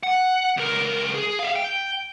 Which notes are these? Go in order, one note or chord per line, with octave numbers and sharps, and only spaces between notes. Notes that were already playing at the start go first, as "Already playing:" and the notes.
F#5
C#2 A#4
G#4
E5 F5
G5